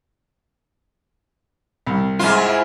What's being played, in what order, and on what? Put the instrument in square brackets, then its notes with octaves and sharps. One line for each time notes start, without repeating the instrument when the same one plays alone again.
[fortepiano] C2
[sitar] G#2 F4 [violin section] E4 G#5